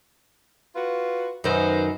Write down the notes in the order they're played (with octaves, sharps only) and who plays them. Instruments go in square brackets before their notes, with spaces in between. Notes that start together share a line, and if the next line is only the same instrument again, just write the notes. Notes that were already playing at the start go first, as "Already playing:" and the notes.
[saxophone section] F4 F#4 B4
[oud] F#2 D#3 [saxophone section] B4 C5